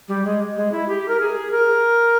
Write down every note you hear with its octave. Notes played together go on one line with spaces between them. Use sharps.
G3
G#3
G#3
E4
G4
A#4
G#4
A#4